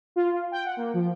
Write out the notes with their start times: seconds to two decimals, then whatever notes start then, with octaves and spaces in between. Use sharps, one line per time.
0.16 F4
0.32 F4
0.52 G5
0.65 F#5
0.77 A#3
0.94 F3